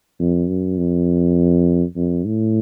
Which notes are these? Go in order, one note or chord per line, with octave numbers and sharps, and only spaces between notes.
F2
F#2
F2
F2
A2